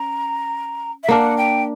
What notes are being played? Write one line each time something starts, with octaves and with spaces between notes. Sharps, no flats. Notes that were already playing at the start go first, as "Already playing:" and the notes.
Already playing: C#4 A#5
E5
A#3 D4 A#4 F#5
G5